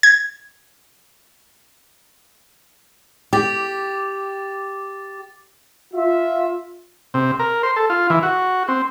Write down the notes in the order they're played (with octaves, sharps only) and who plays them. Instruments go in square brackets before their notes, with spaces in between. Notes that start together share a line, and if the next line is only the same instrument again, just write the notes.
[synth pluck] G#6
[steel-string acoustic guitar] G4 [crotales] D6 A6
[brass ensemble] F4 E5
[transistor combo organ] C3
A#4
C5
A4
F4
E3
F#4
C4